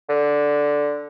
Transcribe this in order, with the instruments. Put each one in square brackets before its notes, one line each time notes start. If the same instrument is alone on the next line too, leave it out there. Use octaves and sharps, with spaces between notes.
[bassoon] D3